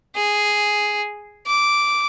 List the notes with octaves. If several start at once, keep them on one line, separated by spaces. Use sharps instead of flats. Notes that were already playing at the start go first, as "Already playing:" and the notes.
G#4
D6